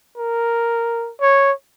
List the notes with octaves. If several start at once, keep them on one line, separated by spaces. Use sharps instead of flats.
A#4
C#5